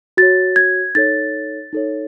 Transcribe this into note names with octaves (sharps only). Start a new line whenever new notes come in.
F#4 C#5 A6
G#6
D#4 A4 C#5 A6
D#4 A4 C#5